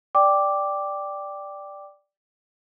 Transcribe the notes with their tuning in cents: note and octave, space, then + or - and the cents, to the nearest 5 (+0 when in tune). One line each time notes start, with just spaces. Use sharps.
D5 +0 G5 +0 D6 +0